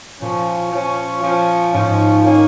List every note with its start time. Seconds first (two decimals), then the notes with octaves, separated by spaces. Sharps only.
0.21 A#2 F3 C#4
0.71 F3 C#4
1.23 F3 C#4
1.73 G#2 F3 C#4
2.24 D#3 A#3 C#4